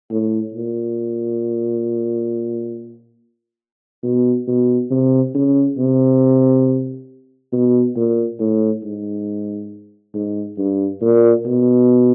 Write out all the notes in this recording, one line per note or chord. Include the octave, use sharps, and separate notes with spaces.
A2
A#2
B2
B2
C3
C#3
C3
B2
A#2
A2
G#2
G#2
G2
A#2
B2